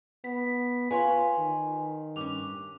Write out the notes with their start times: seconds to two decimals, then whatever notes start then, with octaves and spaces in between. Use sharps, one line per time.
0.24 B3 B6
0.91 F4 B4 C#5 G#5 C6
1.38 D#3
2.16 G2 C#4 D6 F7